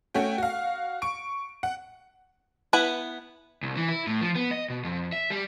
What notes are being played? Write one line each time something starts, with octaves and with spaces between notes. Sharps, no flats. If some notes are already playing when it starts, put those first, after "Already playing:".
A3 C#4 F#4 G5
F#4 F5
C#6 D7
F#5
B3 E4 B4 F#5
C2
E3
E4
A2
F3
B3
D#5
B2
F2
E5
G3